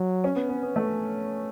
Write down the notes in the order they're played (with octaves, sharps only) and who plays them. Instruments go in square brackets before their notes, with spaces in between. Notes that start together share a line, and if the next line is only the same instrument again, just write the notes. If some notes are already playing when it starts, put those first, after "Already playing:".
Already playing: [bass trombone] F#3
[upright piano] C#4
B3
B3
B3
A3